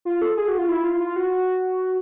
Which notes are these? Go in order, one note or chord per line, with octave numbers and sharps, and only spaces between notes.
F4
A4
G#4
F#4
F4
E4
F4
F4
F#4